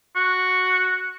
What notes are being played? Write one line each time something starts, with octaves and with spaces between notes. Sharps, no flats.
F#4